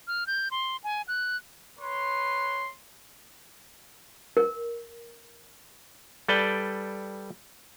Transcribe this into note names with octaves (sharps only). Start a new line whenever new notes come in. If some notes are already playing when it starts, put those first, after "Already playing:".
F6
G6
C6
G#5
F#6
B4 C#5 C6
A#4
G3 A4 B4 D5 G5